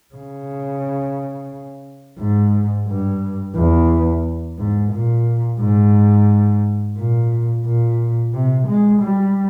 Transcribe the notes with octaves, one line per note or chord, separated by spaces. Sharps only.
C#3
G#2
G2
E2
G#2
A#2
G#2
A#2
A#2
C3
G#3
G3